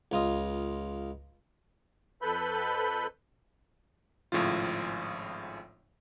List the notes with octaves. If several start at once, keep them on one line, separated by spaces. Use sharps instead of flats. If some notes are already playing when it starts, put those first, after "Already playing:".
C#2 F4 D#5
F2 A4 B4 B5 G6
G#1 A2 C#3 F3 F4